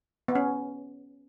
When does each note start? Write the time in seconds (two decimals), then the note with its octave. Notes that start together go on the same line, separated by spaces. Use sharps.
0.28 B3
0.35 C#4